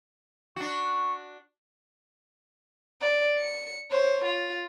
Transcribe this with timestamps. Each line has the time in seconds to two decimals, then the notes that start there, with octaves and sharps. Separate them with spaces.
0.56 D4 F#4 C#6
3.01 D5
3.38 C#7
3.91 C5 C#5
4.25 F4